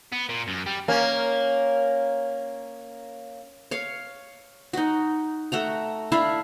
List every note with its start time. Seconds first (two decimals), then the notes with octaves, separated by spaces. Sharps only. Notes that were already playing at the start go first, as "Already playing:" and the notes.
0.12 B3
0.29 A#2
0.48 F#2
0.66 G3
0.88 A#3 C#4
3.71 C#5 F5
4.73 D#4 F#4
5.52 A3 F#4 A#5
6.12 D4 E4 E5 F5